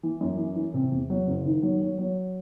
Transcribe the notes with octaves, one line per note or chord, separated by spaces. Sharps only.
E3
F#2
E3
E3
C3
E2
F#3
F#1
D#3
F#3
F#3
F#3